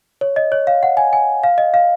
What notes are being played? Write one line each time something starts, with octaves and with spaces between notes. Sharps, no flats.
C#5
D#5
C#5
F5
F#5
G#5
G#5
F5
D#5
F5